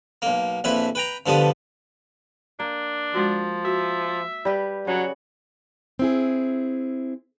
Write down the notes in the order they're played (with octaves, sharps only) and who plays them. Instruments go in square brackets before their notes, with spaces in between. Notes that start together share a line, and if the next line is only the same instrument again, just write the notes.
[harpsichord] B1 A#3
A#1 F2 E4 B4 B5
B4 G5 A#5
G2 D3 F3 B3 A5 D#6
[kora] A#3 [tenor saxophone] D4
[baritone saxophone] F3 [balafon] G#3 F#4
[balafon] F#4 [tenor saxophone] E5
[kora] G3 G4 B4
[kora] C#3 [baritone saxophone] F#3 [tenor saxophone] F#4
[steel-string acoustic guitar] C4 E4 G#4